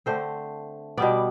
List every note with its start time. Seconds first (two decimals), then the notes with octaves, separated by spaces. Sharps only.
0.06 D3 A3 C4 C5
0.97 B2 G3 B3 D5